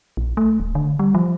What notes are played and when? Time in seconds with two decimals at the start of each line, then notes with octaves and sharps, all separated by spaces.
0.17 A#1
0.37 A3
0.60 D1
0.75 D3
0.99 G3
1.15 F3